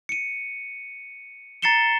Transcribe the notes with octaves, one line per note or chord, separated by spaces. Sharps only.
C#7 D#7
A#5 A6 C7 C#7 E7 G7